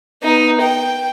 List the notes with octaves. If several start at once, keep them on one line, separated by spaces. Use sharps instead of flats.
B3 D#4
G5